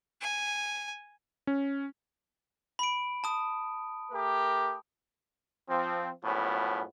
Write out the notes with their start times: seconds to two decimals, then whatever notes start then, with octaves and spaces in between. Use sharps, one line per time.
0.21 G#5
1.47 C#4
2.79 B5 D7
3.24 A5 D#6
4.12 A3 G4 A#4
5.68 F3 C4
6.24 A#1 F#2 A2 F3 B3 C#4